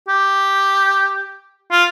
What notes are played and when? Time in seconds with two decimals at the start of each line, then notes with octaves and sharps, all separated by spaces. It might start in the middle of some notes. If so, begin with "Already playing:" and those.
0.08 G4
1.71 F4